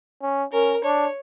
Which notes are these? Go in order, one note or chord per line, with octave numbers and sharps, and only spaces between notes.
C#4
C#4 A#4
D4 C#5